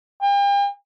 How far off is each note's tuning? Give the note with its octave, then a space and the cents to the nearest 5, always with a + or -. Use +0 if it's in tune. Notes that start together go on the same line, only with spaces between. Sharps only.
G5 +40